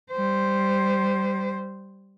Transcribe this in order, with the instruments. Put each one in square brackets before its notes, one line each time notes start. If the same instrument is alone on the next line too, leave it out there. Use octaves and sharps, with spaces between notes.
[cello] G3 C5